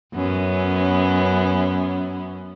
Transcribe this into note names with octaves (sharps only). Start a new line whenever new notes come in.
F#2 B3 C#4